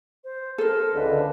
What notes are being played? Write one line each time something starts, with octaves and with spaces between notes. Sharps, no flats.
C5
A4 A#4 C5
C#2 D3 B4